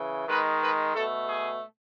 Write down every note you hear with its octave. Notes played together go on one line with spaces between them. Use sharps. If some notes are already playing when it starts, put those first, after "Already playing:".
Already playing: C#3 E3
D#3 G#3 B4
B4
B2 A3 A4
G#4